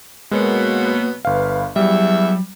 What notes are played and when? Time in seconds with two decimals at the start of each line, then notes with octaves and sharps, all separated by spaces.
0.31 B2 F#3 G#3 A#3 B3
1.25 G1 B4 F5
1.76 E2 F#3 G3 E5